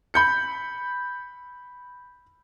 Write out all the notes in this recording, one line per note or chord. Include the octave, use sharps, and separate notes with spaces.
B5 G6 C#7